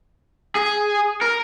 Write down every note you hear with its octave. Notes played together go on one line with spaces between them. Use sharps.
G#4
A#4